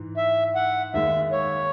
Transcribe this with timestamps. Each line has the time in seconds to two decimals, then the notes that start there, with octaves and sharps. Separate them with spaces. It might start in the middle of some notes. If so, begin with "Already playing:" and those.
Already playing: G#2 E3
0.17 E5
0.56 F#5
0.94 D#2 D#3 G#3 E5
1.32 C#5